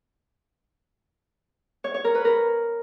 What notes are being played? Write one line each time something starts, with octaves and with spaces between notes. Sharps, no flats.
C#5
C#5
A#4
B4
A#4